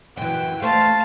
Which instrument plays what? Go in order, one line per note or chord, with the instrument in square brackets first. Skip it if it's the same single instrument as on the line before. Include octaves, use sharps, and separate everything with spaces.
[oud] F#2 E3 [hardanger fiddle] G5
[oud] A3 C5 [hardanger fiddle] F5 A5